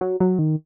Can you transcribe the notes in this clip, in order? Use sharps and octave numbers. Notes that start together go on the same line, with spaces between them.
F#3
F#3
D#3